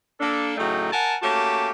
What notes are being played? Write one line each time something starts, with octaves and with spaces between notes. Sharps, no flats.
A#3 D4 A4
A2 C#3 F#3 A3 D#4 G5
A#4 F#5 G#5 A5
A3 A#3 C#4 F#4 G4 A5